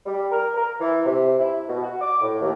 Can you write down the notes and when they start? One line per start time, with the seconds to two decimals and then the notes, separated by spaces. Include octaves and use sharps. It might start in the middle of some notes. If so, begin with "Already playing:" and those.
0.06 G3
0.32 A#4
0.56 A#4
0.80 E3
1.05 C3
1.39 E4
1.69 B2
1.83 F#4
2.01 D6
2.21 A2
2.41 D#2